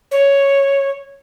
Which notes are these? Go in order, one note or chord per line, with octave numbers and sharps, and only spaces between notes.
C#5